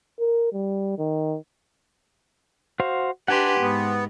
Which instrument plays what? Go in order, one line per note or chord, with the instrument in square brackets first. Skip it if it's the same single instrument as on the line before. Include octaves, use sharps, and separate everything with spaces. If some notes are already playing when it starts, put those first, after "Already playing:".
[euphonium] A#4
G3
D#3
[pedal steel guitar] F#4 C5 F5
[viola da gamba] D4 G4 B4 [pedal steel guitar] F#5 G#5 C6
[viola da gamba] G#2 [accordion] B3